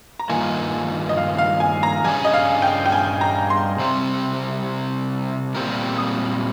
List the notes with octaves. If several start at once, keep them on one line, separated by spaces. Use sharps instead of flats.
A#5
G2 D#3 A#3 F4 G#5
D#5
F5
F5
G#5
A#5
G2 G3 A#3 C#4 G#4 G#5
D#5
F5
G5
G5
G#5
A#5
C6
C3 G3 C4
A#2 G3 C4 G4 A#4
D#6